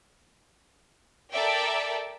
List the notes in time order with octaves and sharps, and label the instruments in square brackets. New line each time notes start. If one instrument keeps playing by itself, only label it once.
[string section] A4 A#4 D5 E5 G5